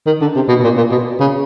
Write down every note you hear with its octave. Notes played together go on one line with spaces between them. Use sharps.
D#3
D3
C3
B2
B2
A#2
A#2
B2
C#3